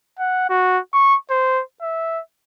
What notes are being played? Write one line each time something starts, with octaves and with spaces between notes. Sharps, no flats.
F#5
F#4
C#6
C5
E5